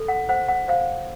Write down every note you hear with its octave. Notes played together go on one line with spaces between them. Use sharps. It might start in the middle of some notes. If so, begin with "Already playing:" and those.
Already playing: A4
F#5
C5 F#5
F#5
C5 F5